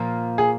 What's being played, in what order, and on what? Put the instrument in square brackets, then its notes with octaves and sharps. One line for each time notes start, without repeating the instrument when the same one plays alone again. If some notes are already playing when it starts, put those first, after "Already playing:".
Already playing: [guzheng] A#2 F3 A#3
[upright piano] G#4